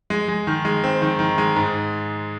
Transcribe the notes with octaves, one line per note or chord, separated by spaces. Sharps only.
G#3
G#3
D#3
G#3
C4
D#3
D#3
G#3
G#2